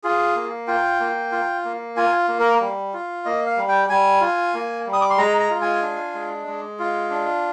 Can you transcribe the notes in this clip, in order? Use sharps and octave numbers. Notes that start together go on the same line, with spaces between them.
F4 G#4
A#3
F4 G5
A#3
F4
A#3
F4 G#5
A#3
A#4
G3
F4
A#3 D#5
F5
G3
G5
G3 G#5
F4
A#3
G3
D#6
D6
C6
G#3 A#5
A#5
F4
G#5
D4
G#3
G#3
F4
D4